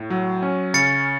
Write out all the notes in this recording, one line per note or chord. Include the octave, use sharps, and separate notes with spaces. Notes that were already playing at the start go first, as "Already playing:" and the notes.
Already playing: A2
F#3
C#4
C#3 A6 C#7